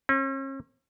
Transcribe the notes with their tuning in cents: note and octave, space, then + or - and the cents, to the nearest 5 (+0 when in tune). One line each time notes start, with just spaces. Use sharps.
C#4 -45